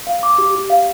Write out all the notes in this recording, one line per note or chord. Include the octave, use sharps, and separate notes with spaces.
F5
D6
G4
G4
F5